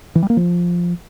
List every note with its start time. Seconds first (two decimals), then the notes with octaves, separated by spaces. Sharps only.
0.15 E3
0.23 G3
0.30 A#3
0.37 F3